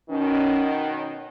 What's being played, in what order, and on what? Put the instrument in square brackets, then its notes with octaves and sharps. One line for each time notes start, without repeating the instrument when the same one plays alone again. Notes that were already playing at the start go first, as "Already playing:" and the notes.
[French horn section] B2 D#3 [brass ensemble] C#4
[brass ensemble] C#4